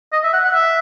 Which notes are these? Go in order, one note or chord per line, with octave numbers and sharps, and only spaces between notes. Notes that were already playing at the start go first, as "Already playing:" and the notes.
D#5
E5
F#5
F#5
E5